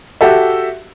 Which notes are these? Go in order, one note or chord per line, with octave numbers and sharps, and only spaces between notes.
F#4 G4 A4 E5